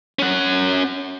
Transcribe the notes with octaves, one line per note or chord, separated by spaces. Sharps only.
C#4 F#5